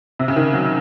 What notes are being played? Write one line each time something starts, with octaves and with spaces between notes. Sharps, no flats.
C3
C#3
D#3
F#3